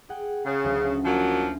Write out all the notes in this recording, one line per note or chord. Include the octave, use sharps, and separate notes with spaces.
G#4 F#5 G5
C#3
D2 F#3 C#4
F3 F#3 A#3 G#5